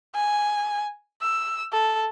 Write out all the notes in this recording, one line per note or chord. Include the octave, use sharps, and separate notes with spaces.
G#5
E6
A4